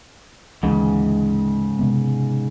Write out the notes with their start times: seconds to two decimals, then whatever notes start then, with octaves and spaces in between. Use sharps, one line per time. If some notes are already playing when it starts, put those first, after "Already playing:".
0.63 D2 G#2 C#3 E3
1.79 C3 G#3 B3